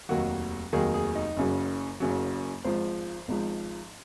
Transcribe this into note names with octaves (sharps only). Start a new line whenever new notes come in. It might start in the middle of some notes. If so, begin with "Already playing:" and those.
F1 D#2 D#3 F#3 F#4
F1 D#2 D#3 F#3 G#4
G#4
D#4
F#1 F#2 C#3 F#3
F#1 F#2 C#3 F#3
G#1 G#2 F3 C5
G#1 G#2 F3